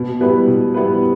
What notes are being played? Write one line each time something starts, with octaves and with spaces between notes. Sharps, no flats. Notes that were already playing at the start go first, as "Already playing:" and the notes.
Already playing: B2
G3 B3 E4 B4
B2
G3 B3 E4 B4